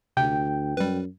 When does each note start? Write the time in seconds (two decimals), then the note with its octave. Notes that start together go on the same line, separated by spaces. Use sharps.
0.17 D2 C3 G5
0.77 F#2 G3 B4